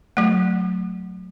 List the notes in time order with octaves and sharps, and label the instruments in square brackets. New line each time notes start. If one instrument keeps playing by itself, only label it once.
[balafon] F#3 A3